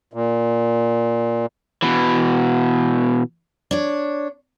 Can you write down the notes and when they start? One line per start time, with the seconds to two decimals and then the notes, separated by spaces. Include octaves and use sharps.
0.14 A#2
1.82 B2 E3
3.71 D4 C#5